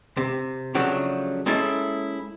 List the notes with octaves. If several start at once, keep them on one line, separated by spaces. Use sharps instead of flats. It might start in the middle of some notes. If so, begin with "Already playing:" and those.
C3
C#3 F3 F#3 A3 D4
G#3 A#3 C#4 E4 A4